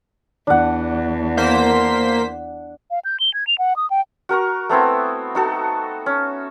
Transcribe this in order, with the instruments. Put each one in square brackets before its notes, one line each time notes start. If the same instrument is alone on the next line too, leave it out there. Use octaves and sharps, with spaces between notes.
[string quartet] E2 [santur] D4 F#5
[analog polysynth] A#3 C5 B6
[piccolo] F5
G6
G7
G#6
F7
F#5
D#6
G5
[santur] F#4 A#4 A#5 C#6
A3 B3 C4 E4
D#4 F#4 A4
C#4